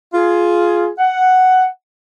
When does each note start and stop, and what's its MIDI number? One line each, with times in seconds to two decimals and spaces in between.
0.14 0.89 65
0.14 0.89 68
0.99 1.67 78